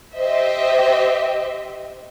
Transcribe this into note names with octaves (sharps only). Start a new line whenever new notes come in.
G4 C5 D#5 E5